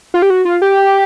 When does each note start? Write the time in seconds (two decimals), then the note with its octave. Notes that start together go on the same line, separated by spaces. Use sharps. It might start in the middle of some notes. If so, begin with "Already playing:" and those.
0.14 F4
0.22 G4
0.30 F#4
0.45 F4
0.62 G4